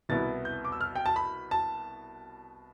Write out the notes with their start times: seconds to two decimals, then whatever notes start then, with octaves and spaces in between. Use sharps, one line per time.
0.09 C2 B2 B3 E4 A6
0.45 G6
0.65 D6
0.72 E6
0.81 F6
0.96 G5
1.06 A5
1.16 B5
1.51 A5